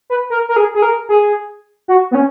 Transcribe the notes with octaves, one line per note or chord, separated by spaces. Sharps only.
B4
A#4
A#4
G#4
G#4
A#4
G#4
F#4
B3
C#4